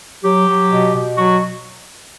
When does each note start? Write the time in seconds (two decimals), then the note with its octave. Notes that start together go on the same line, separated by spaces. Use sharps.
0.24 F#3 G4
0.48 F#3
0.71 B2
0.94 B2
1.17 F#3 F#4